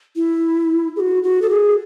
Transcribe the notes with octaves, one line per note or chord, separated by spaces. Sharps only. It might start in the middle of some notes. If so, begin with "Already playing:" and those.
E4
G#4
F#4
F#4
A4
G#4